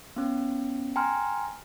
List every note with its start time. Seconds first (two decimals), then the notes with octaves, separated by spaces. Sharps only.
0.16 B3 C#4
0.96 G5 G#5 A#5 C6 F6